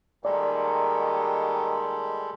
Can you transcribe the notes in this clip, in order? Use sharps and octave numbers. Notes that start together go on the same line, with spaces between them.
A#2 D#3 G3 G#3 A4 D5